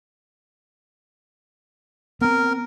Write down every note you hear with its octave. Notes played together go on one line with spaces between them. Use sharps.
B3 C4 A#4